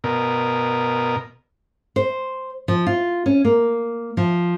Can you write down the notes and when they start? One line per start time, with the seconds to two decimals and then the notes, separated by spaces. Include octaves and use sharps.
0.04 B2 A#4
1.96 C5
2.68 F3
2.87 F4
3.26 C#4
3.45 A#3
4.17 F3